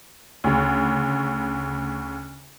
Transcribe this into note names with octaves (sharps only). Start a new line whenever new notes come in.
D2 C#3